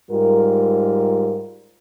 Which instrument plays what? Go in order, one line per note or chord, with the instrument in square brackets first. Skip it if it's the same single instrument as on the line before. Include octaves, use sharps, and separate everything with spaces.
[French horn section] G#2 G3 F4 A#4